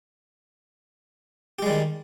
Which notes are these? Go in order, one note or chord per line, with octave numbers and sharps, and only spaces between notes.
D#3 G3 G#3 G4